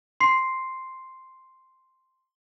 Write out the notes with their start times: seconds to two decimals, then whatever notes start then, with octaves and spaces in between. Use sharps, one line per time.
0.20 C6 C7